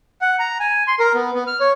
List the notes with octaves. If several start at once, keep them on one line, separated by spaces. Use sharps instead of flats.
F#5
A#5
G#5
C6
A#4
B3
B3
F6
C#5